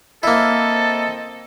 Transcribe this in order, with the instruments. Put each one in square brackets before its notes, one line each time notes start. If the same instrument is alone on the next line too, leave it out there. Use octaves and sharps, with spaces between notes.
[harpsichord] A#3 E4 [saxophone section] C4 D#5 [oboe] A4